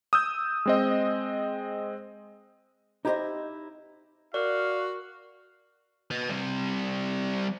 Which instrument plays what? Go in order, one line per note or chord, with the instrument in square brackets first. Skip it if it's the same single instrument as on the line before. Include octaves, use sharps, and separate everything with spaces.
[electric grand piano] D#6 E6 G6
G#3 C4 D#5
[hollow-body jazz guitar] D#4 E4 G4 A4 C5 D#5
[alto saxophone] F#4 [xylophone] A#4 [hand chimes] D5 [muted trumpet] F5
[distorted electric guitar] B4 D#5
G3 C4